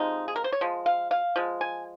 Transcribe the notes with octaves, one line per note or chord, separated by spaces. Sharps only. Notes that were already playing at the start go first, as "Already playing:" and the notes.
Already playing: C3 F3 G#3 D#4
G#4
A#4
C5
C#5
F3 G#3
F5
F5
F3 G#3
G#5